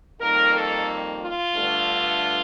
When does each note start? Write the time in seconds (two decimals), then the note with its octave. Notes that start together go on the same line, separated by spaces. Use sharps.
0.21 F2 D#3 G3 A#3 A#4
0.55 A4
1.21 F4
1.54 G2 D3 A3